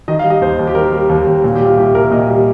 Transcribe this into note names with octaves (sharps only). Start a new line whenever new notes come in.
D#3 D#5
F5
G3
D#5
D#2 C5
D#2
G4
D#3 A#4
G3
D#2
D#2
A#2
G4
G3
F4
C2 G4
C2 A#4
A#2 D#5
G3